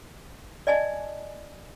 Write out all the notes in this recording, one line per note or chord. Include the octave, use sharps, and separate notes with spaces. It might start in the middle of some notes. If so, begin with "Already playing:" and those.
D5 D#5 G#5 A5